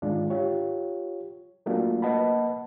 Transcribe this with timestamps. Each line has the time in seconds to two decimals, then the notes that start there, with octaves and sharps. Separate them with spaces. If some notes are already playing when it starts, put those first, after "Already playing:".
0.02 G#2 D3 D#3 G#3 D4 F4
0.30 F4 G4 C#5
1.66 F#3 A3 A#3 D4 F4 F#4
2.02 A#3 B4 D#5 F#5 A5 B5